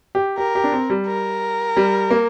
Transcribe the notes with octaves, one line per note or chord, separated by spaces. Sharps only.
G4
G4 A#4
G4
D4
C4
G3
A#4
G3
A#3